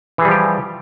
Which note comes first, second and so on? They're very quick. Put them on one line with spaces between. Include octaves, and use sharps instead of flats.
E3 G#4 G3 F3 G4